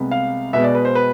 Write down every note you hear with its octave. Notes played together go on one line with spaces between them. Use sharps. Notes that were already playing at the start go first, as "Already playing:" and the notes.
Already playing: C2 C3 G#3 B3
F5
B2 G#3 B3 E5
D5
B4
C5
B4